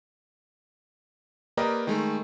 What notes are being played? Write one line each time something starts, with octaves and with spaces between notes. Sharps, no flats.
A#3 G4 A#4 B4 D5 D#5
D#3 G#3 A3